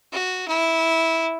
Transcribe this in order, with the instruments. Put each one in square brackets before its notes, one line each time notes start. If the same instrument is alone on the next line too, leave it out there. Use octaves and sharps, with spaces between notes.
[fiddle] F#4
E4